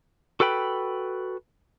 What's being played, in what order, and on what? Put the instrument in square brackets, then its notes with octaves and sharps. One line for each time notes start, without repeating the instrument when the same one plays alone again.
[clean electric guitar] F#4 A4 B4 G5 B5